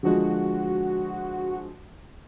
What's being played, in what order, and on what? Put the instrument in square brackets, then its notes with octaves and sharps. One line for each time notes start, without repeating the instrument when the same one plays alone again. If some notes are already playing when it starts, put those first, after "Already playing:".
[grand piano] D3 F3 G#3 [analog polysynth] F#4